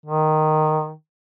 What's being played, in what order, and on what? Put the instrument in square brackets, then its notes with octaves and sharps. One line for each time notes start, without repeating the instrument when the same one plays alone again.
[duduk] D#3